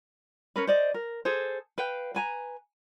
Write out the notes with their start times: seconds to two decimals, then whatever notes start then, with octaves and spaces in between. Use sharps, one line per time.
0.56 C#4 A#4 B4
0.67 C5 D5 D#5
0.94 A#4
1.25 G#4 A4 C5
1.78 B4 F5 G5
2.15 B4 G#5 A#5